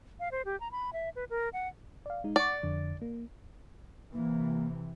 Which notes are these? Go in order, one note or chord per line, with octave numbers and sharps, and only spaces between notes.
F5
C5
G4
A#5
B5
E5
B4
A#4
F#5
D5 F5
G#3 D#4
D5 F#5 C#6
F2 D3
A#3
C3 E3 A#3